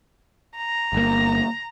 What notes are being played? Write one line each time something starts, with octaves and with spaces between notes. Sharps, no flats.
A#5
G1 A#3